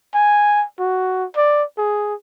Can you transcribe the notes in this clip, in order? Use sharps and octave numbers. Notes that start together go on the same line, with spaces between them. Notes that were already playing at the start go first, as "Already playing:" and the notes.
G#5
F#4
D5
G#4